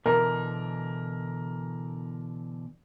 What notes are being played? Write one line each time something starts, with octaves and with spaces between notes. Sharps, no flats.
B2 D3 E3 A#4